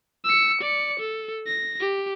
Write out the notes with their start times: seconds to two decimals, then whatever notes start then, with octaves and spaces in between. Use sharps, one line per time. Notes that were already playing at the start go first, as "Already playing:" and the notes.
0.24 E6 C#7
0.61 D5 C#7
0.99 A4
1.46 A#6
1.80 G4